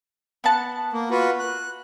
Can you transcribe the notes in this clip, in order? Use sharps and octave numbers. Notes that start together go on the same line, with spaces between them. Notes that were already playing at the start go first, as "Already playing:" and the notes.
B3 F#5 A5
A#3
F4 F#4 B4
F#6